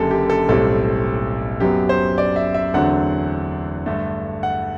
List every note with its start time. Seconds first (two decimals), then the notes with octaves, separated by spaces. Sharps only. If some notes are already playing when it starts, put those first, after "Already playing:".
Already playing: F#1 F#2 D3 G4 A4
0.11 G4
0.30 A4
0.49 B1 A2 G3 C4 A4
1.60 F#2 F#3 B3 G4
1.89 C5
2.18 D5
2.36 E5
2.54 E5
2.74 E2 D3 F#3 A3 C4 F#5
3.86 G2 D3 A3
4.43 F#5